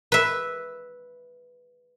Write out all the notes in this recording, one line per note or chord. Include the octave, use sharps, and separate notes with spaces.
B4 E5